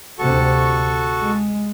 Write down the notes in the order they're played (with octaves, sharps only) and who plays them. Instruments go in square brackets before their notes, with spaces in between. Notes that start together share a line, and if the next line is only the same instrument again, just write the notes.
[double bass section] D2 C3 [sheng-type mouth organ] F#4 A4 C#6
[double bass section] G#3